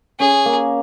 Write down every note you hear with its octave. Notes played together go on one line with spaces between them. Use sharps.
C#4 G#4
A#3